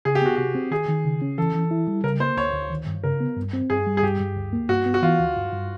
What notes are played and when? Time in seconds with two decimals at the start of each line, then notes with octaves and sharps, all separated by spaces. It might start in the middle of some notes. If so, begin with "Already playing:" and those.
0.05 C#3 G#4
0.15 G4
0.22 B3 F#4
0.36 C3 G4
0.55 C4
0.71 D#3 G#4
0.88 D#3
1.05 C#3
1.22 C#4
1.38 E3 A4
1.54 E3
1.71 E4
1.88 G3
2.04 C#3 A#4
2.20 A#3 C5
2.37 D2 C#5
2.53 D2
2.70 D#3
2.87 G2
3.04 C#3 A#4
3.20 B3
3.37 G2
3.53 C4
3.70 G2 G#4
3.86 G3
3.97 G#4
4.03 G2 G4
4.20 G2
4.37 D2
4.53 A#3
4.69 G2 F#4
4.86 B3
4.94 F#4
5.02 E3 F4
5.19 D2
5.36 G2
5.52 G2